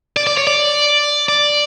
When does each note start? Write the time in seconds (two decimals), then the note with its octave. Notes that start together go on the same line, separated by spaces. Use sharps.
0.17 D5
0.27 D5
0.37 C#5
0.47 D5
1.29 D5